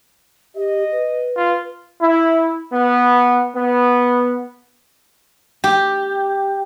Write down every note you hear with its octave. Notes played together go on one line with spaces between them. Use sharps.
G4 D#5
B4
F4
E4
B3
B3
G4